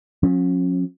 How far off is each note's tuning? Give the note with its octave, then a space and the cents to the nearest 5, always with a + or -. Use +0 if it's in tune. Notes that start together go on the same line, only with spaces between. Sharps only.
F3 +45 C#4 -25